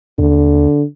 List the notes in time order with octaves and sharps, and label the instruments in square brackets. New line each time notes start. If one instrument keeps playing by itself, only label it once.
[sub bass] D#2 [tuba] D3